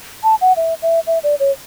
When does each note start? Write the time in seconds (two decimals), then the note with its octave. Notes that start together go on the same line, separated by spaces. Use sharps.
0.24 A5
0.41 F#5
0.57 E5
0.82 E5
1.07 E5
1.24 D5
1.40 C#5